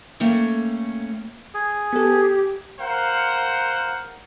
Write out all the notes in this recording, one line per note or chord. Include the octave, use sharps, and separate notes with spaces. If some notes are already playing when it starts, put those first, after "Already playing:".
A3 A#3 C#4 G5
G#4
B3 G4 A4
A#4 C5 F5 F#5